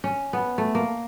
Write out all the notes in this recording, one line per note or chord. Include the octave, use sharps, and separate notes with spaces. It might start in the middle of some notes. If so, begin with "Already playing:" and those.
C#4
B3
A3
A#3